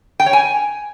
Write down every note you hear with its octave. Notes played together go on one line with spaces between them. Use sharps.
G5
C#5
G#5